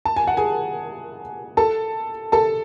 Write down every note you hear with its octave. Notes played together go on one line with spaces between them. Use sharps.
A5
G#5
F#5
G#4 G#5
A4 A5
A4 A5